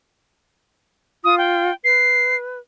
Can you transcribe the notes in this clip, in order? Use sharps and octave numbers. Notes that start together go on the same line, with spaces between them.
F4 D#6
G5
B4 C7